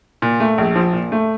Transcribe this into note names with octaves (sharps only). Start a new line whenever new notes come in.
A#2
A3
A#1
F3
A#2
A3